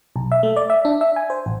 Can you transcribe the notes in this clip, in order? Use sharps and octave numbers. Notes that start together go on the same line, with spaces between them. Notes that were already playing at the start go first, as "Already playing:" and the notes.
B1
E5
A3
D5
E5
D4
E5
G#5
C5
A1